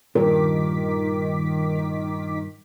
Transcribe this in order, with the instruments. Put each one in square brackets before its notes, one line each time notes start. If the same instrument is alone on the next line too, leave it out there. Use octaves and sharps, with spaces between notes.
[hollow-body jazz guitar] G2 A#2 [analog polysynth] D#3 D6 B6 [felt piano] A#4